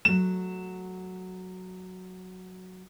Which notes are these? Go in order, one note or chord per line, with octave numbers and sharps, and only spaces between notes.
F#3 A3 E7